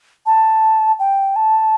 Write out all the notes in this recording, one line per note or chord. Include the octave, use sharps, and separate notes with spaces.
A5
G5
A5